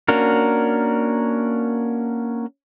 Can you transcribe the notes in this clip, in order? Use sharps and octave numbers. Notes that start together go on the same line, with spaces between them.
A#3 C#4 D4 F#4 A#4